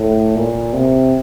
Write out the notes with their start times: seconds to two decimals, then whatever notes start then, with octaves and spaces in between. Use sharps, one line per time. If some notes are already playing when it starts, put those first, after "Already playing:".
Already playing: A2
0.35 A#2
0.73 C3